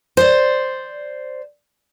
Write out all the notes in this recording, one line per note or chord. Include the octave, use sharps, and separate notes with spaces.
C5 D5